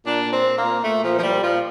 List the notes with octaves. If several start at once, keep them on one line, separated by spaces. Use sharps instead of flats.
A#2 D4
A#2
C4
A#2
A#3
A#2
A#2 A3
A#2 F3
F3
A#2 G3
A#2 F3